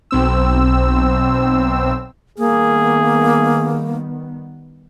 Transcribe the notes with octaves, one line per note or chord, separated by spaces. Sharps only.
B1 C4 E6
D#3 G3 A#3 B3 G#4